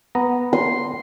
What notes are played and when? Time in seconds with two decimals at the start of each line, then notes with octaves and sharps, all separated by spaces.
0.15 B3 A#5
0.53 C6